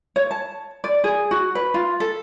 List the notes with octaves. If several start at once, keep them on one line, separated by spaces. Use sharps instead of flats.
C#5
A5
D5
G#4
F#4
B4
F4
A4